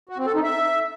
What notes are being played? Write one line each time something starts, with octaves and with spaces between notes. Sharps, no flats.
F#4
C4
A4
D#4
E5